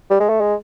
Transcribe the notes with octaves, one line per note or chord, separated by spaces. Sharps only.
G3
G#3
A3
G#3